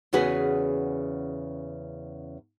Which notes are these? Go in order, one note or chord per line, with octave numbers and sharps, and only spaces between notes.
E2 C#3 C#4 F#4 G#4 B4